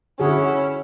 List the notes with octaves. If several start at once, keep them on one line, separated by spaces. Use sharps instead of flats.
D3 C#4 E4 F#4 G#4